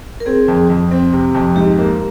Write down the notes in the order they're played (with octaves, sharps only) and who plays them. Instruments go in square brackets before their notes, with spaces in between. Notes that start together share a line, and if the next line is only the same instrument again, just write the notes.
[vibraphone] A#4
[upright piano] C4 [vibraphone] G#4
[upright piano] F2
F2
C4
C3
F2
[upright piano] G#2 [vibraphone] G4
[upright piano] A#3